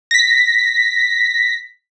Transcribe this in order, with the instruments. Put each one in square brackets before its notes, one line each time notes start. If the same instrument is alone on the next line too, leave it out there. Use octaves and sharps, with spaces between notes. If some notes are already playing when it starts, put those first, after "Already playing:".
[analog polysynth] A#6 B6